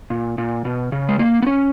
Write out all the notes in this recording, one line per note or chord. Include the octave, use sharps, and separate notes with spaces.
A#2
A#2
B2
C#3
G#3
A#3
B3
C#4